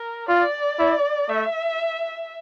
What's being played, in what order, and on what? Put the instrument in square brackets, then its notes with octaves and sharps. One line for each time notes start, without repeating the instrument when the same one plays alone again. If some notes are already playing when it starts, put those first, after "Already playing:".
Already playing: [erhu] A#4
[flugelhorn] F4 [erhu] D5
[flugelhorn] E4
[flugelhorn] A3 [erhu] E5